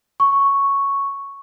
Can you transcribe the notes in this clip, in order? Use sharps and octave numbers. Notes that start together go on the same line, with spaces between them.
C#6